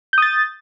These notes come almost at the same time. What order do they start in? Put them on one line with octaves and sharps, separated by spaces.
G6 D#6 A6